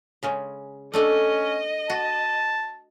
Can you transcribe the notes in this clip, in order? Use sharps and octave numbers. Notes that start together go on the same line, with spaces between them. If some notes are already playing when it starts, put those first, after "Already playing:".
C#3 G#3 C#4
A3 C#4 D4 A4 D#5
F#4 A5